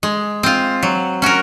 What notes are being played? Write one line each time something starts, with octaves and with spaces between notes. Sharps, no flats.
G#3
C4 F4
F#3
C#4 F#4 A#4